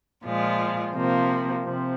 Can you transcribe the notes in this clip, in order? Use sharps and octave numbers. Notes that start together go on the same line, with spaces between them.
A#2 F3 G#3 F4
C3 F3 A#3
C3 F3